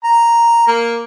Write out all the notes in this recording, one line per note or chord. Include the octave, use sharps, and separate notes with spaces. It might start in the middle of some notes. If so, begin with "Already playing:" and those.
A#5
A#3